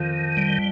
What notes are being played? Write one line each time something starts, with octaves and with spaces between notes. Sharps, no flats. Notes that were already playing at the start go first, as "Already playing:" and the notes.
Already playing: F2 D#3 F3
G3